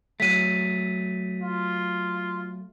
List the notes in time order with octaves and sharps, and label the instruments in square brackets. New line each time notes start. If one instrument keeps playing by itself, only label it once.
[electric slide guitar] F#3 A3 [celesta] B6 D#7
[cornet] F4